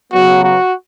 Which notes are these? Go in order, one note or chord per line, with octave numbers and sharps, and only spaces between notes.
C#3 F#3 B3 F#4
F#4